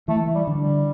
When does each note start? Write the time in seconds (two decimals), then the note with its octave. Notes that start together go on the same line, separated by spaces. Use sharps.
0.08 E3 A3
0.35 G3
0.47 D3
0.60 G3